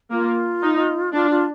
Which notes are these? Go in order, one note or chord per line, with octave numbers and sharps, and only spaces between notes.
A#3 F4
D#4
D4 F4
F4